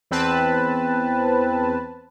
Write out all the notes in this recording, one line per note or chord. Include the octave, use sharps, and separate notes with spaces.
E2 C4 B4 A5